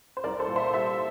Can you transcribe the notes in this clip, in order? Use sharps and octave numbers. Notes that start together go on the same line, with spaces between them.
C5
C2 A#4 D5
A4 C5
A#2
C5 E5
G3 C5 E5